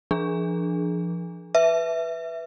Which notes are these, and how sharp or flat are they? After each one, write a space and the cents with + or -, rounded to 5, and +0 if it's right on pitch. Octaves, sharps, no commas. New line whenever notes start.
F3 -30 D4 +10 G#4 +20
B4 +0 E5 +0